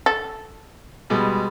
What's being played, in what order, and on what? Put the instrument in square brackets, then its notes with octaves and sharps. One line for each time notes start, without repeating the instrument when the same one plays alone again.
[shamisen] A4
[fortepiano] B2 G3 G#3